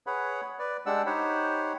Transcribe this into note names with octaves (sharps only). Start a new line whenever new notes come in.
G#4 B4 C#5 F#5 B5
B4 D5
G#3 D4 G4 D5 F#5 E6
D#4 G4 C5 C#5 F#5 B5